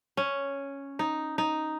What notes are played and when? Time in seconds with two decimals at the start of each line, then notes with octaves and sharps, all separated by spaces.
0.17 C#4
0.99 D#4
1.38 D#4